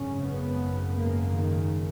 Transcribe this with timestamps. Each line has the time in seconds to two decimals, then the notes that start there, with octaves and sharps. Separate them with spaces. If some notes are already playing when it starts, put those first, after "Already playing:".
Already playing: G#1 F#2 C#3 C#4
0.26 B3
0.99 A#3
1.37 D#3